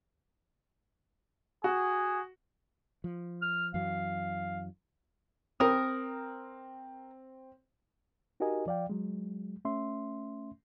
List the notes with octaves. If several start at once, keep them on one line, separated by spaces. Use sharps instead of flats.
F#4 G#4
F3
F6
F#2 E3 F#3 F5
C4 A#4 D#6
D#4 F#4 G4 A#4 D#5 G#5
F3 D5 F5 G5
F#3 G#3
A3 C#4 E5 C6